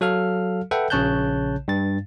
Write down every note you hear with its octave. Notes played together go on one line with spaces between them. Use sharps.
F#3 A4 F5 F6
A4 B4 E5 F#5 G5
A#1 C#3 C#5 A5 F#6 G6
G2 A6